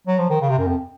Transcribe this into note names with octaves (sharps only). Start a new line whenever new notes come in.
F#3
F3
D#3
C#3
C3
F#2
F2